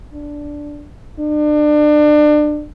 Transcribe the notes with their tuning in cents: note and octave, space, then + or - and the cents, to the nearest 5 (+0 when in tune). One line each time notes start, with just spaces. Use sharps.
D4 -5
D4 +30